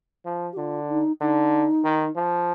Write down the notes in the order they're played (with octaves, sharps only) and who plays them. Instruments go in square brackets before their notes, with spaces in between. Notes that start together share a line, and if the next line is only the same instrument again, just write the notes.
[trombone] F3
[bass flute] G4
[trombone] D3 [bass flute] F4
[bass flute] D#4
[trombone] D3 [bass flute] D#4
[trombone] D#3
F3